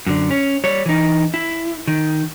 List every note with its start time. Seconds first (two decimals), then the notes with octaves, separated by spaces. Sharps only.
0.07 F#2 D3
0.31 C#4
0.64 G3 C#5
0.86 E3 D#4
1.34 E4
1.87 D#3